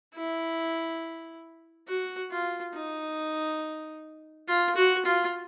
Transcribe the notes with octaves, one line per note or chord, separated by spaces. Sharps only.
E4
F#4
F4
D#4
F4
F#4
F4